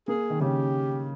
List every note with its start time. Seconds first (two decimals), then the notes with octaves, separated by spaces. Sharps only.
0.08 A#3 G#4
0.30 D#3
0.40 C#3 G4